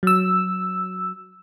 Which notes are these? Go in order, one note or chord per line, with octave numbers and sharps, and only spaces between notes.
F#3 E6